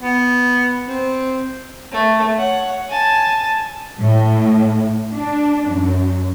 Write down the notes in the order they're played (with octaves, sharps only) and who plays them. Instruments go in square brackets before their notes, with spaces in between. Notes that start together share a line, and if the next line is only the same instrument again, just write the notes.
[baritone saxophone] B3
C4
[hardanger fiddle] A3
C#5 F#5
G#5 A5
[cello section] A2
D4
F#2